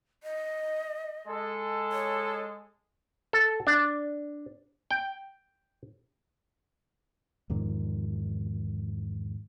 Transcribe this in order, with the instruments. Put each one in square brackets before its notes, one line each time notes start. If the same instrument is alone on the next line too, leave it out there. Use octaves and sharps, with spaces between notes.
[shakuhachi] D#5
[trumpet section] G#3 A4
[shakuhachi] C#5
[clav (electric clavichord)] A4
D4
G5
[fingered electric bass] E2 G#2 D#3 F3